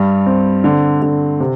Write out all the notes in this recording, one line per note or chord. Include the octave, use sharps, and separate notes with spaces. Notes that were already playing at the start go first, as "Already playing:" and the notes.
Already playing: G2 G3
C4
D3
D3
C3